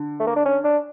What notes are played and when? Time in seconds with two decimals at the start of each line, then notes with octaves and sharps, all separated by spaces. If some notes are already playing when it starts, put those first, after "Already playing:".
Already playing: D3
0.20 A3
0.27 A#3
0.36 D4
0.46 C#4
0.64 D4